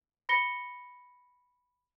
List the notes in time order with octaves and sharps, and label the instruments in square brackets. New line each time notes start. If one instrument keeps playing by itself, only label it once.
[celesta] B5 A#6 C#7 G7